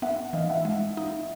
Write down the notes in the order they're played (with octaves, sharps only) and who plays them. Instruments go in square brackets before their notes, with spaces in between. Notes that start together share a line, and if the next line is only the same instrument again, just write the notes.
[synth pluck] B3 [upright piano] E5 F#5
[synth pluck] E3 [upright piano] D#5 F5
[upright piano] E5 F#5
[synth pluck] G#3
D#4